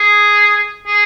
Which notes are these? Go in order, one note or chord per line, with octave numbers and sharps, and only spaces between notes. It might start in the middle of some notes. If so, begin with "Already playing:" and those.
Already playing: G#4
G#4